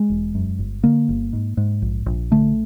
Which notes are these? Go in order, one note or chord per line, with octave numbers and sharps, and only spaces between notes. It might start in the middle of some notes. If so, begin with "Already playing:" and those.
Already playing: G#3
E1
F#2
G1
D3 A#3
G1
G#2
G#2
A#1
A#1
D3 A3